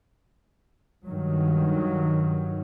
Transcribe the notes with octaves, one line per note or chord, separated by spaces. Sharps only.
G2 D#3 F#3